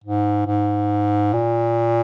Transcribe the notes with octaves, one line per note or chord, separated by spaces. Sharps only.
G#2
G#2
A#2